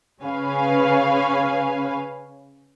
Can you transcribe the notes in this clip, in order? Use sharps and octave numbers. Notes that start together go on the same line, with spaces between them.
C#3 C#4 B4 F5 G#5